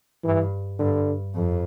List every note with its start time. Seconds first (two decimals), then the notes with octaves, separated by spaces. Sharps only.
0.24 G2 E3
0.79 G2 D3
1.35 F2